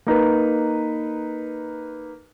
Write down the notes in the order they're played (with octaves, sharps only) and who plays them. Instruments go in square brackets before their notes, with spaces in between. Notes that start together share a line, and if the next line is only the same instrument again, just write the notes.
[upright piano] A#3 D#4 B4